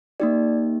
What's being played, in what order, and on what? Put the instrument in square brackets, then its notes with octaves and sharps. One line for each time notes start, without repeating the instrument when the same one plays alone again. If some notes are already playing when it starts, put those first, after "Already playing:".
[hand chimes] A#3 D#4 G4 D5